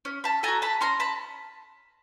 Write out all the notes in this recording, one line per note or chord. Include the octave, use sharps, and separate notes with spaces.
C#4
A5 B5
F#4 A4 G#5 A#5
A5 B5
C#4 A#5 C6
A5 B5